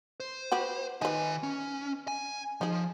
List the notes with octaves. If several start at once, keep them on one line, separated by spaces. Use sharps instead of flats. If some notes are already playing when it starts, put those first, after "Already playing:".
C5
F#4 G4 B4
D#3 D#4 B4 G#5
C#4
G#5
F3 D#4 G#4